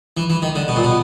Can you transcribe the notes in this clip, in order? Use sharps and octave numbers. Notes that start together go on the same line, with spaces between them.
E3
E3
D#3
D3
B2
A#2
B2